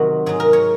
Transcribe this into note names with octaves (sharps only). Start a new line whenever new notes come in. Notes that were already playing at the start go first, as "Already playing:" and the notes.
Already playing: C3 D#3 F#3 F#4
G#2 F#3 G#4
A#4
C#5